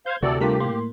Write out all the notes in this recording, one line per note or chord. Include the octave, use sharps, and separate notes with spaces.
C5 F5 G6 G#6
D2 C3 E3 F#4 A4 D5
G3 A3 D4 F4 G4 A#4 B6
A2 A#3 C6